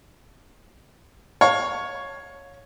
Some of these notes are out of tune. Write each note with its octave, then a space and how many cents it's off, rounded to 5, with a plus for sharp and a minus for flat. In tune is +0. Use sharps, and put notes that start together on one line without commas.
C#5 +0 F5 +25